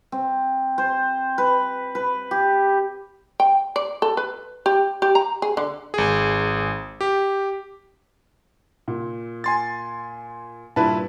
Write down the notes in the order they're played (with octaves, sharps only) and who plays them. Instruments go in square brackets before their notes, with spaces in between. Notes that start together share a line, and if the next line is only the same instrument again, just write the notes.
[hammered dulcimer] C4
C5
B4
B4
G4
[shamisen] G5
D5
A4
B4
G4
G4
A#5
G#4
D3
[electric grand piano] G#1 G#4
G4
[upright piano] A#2
[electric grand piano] G#5 C6 A6
[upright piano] G2 A#2 [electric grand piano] E4 B4 A5